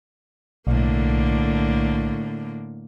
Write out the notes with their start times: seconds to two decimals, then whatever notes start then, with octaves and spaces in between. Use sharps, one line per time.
0.67 B1 A2 D3 A#3